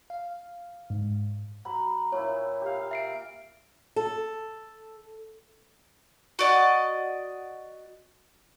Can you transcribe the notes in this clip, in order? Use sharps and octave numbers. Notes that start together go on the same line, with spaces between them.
F5
G#2
F#3 B5
A#2 E4 C#5
G4 F5
E5 C7 D7
A4
F#4 D5 D#5